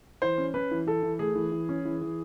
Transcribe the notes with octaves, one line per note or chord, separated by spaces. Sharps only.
E3 C5
C#4
C#4 B4
E3
E3 A4
E3
A3 G#4
E3
E3
C#4
E3
E3